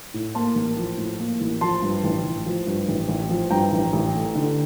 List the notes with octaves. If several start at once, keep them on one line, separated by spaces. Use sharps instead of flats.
A2
A#3 A5 C6
A1
F3
A2
A#3
A1
F3 A5 C6
G2
A1
A1
F3
G2
A1
A1
F3
G2 G5 A#5
A1
A1
A3
D3